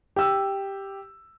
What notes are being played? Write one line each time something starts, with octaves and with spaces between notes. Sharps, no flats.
G4 E6